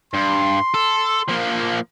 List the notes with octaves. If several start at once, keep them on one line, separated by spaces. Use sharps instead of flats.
G2 C6
A4
F3 A#3